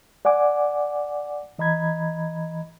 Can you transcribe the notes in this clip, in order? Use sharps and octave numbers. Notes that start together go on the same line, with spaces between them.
D5 F#5 G#5 D6
E3 D#5 A#5 B5 G#6